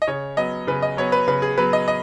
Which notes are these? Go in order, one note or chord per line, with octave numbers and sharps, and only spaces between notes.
D#5
C#3 C#5
F#3 B3 D#5
C#3 B4
D#5
F#3 B3 C#5
B4
C#3 B4
G#4
F#3 B3 B4
D#5
D#5